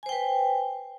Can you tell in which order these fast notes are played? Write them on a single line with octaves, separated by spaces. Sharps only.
G#5 C5 G5 B4